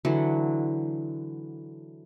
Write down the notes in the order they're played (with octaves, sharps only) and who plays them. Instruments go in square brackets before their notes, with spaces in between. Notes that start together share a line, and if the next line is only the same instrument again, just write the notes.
[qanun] D3 E3 F#3